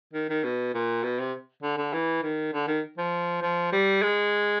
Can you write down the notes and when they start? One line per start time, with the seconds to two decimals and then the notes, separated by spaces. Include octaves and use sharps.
0.13 D#3
0.29 D#3
0.44 B2
0.74 A#2
1.04 B2
1.19 C3
1.63 D3
1.78 D3
1.93 E3
2.23 D#3
2.54 D3
2.68 D#3
2.98 F3
3.42 F3
3.72 G3
4.02 G#3